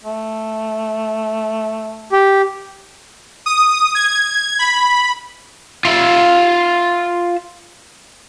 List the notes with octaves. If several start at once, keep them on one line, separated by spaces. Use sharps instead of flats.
A3
G4
D#6
G#6
B5
F4 E5